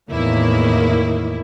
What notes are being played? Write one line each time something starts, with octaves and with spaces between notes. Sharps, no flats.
E2 A2 D#3 A#3 E4